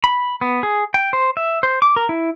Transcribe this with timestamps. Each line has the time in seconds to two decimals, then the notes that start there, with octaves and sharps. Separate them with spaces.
0.04 B5
0.41 B3
0.63 G#4
0.94 G5
1.13 C5
1.37 E5
1.63 C5
1.82 D6
1.96 A#4
2.09 E4